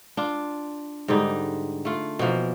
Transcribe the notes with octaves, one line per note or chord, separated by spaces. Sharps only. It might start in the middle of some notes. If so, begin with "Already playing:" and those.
D4 F4
G#2 D3 G3 D#4
A3 F4
B2 E3 F3 A#3